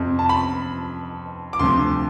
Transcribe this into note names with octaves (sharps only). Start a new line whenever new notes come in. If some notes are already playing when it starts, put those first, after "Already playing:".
Already playing: F2 C3 F3
A5
B5
D6
D2 C3 F3 C6